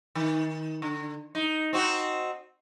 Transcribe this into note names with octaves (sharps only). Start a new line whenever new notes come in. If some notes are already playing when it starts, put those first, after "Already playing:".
D#3
D3
D#4
C4 D#4 F#4